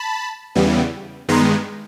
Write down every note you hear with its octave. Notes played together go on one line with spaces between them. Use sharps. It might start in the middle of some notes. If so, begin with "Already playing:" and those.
Already playing: A5 B5
E2 C#3 E3 G3 B3
G2 D#3 G#3 B3 A#5 C6